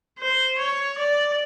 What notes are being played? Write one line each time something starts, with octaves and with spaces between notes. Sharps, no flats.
C5
C#5
D5